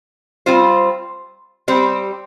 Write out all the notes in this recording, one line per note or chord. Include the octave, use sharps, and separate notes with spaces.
G3 C4 F4 C5
G3 C4 G4 C5